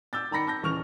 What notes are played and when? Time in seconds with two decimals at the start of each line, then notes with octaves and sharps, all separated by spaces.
0.13 D6 E6 G6 A6
0.31 D#3 A#5 B5 A#6 C#7
0.47 A5 G6 A#6
0.62 D#1 C#3 E3 C#6 F6 F7